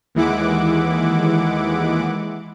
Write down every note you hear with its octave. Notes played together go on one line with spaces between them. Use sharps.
D#2 E3 G#3 E4 F#5 D6